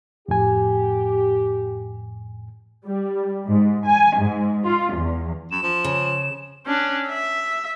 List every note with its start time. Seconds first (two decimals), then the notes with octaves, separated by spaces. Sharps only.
0.28 F2 A2 G4 G#5
2.85 G3
3.47 G#2
3.86 G#5
4.18 G#2
4.66 F4
4.94 E2
5.51 F#2 E7
5.63 F3
5.84 C#3
6.66 C#4 D4
7.07 E5